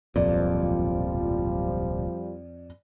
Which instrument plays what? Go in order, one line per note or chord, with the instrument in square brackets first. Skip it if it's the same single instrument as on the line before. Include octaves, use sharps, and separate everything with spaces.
[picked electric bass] D1 B1 A#2 [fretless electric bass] F2 [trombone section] F3 G3 [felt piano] D5